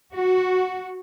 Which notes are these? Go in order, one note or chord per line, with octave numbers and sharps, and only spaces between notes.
F#4